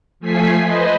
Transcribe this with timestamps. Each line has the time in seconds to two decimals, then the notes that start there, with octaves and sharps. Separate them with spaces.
0.20 F3 A3 G#5 B6 C7
0.64 B4 C5 D#5